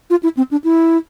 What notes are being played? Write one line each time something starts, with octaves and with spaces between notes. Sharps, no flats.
F4
E4
C4
D4
E4